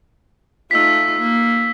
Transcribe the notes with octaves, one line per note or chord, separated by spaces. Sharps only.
A3 D#4 F4 E6 B6
A#3